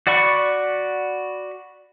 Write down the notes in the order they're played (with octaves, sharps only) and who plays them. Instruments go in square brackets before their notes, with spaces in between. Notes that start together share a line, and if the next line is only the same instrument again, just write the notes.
[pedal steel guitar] F#4 D5 F#5 B5 C#6